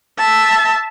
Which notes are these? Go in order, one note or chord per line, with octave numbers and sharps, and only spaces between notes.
E5 A5